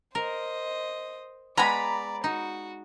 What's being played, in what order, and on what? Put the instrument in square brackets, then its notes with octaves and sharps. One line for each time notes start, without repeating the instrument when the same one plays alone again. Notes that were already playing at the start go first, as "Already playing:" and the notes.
[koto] A#4 [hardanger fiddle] C5 D#5
[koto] G#3 B3 G#4 [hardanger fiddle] D5 [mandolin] A#5 B5
[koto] D#4 [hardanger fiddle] F#4